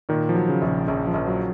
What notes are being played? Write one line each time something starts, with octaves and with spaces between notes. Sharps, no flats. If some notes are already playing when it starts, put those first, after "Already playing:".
A#2 D#3
F3
F#3
C#3
A#1
C#3
A#1 C#3
F3
A#1
F#3